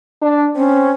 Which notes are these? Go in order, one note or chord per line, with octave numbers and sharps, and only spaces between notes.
D4
C4 C#4